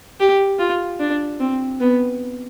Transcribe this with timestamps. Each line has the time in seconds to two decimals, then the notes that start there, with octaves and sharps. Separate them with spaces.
0.20 G4
0.59 F4
1.00 D4
1.39 C4
1.80 B3